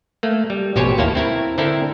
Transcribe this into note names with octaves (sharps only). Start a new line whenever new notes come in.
A3 A#3
G3
A1 B2 G4 C5 C#5 G#5
D#2 A#3 E4 C#5 A5
C4 E4 A#4
D3 C4 E4 A4 A#4